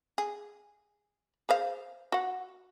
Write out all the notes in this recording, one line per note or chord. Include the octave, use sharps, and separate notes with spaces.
G#4
G#4 C5 F5
F#4 F#5